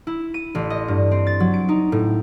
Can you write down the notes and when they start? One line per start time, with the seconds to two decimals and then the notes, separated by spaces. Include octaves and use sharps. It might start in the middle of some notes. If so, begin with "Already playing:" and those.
0.07 E4
0.34 D#7
0.55 A1
0.70 D#5
0.88 G2
1.11 C4
1.27 A6
1.40 F#3
1.54 D7
1.69 D#4
1.92 A2